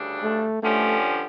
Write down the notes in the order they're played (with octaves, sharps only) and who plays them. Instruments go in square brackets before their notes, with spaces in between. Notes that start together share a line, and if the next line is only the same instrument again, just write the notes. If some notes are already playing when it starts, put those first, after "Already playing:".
Already playing: [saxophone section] D2 C#3 G3 D4
[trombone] A3
[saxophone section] G2 D3 F3 C#4 G4 [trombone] A3